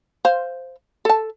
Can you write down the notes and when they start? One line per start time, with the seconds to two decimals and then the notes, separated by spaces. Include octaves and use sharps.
0.25 C5 F5
1.05 A4 A5